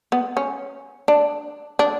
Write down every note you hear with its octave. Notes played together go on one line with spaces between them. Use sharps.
B3
C#4
D4
D4